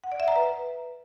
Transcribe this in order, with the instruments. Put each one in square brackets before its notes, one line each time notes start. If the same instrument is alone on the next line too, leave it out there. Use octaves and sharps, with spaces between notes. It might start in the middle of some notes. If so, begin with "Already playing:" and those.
[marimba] F#5
D5
E5
A#5
B4